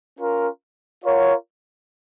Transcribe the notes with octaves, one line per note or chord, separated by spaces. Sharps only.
C#4 F4 A#4
F4 A#4 C#5 F#5